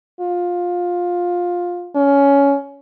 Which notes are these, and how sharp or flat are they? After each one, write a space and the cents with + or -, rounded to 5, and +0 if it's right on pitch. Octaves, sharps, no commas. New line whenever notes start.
F4 +15
C#4 +15